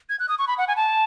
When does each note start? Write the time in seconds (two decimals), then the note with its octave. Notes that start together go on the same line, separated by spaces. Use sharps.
0.09 G#6
0.19 F#6
0.29 D#6
0.39 C#6
0.48 B5
0.58 F#5
0.68 G#5
0.76 A5